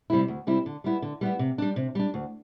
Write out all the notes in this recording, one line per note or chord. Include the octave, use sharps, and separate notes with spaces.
C3 G3 C4 E4
D2
C3 G3 C4 E4
D3
G3 B3 E4
D3
G3 B3 E4
C3
G3 D4
C3
G3 D4
D2